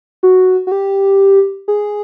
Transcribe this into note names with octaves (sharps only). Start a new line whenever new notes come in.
F#4
F#4
G4
G#4